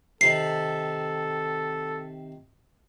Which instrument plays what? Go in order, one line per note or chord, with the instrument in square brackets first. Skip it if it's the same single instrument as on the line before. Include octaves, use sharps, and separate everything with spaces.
[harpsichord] C3 D#3 [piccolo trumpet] A4 [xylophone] C7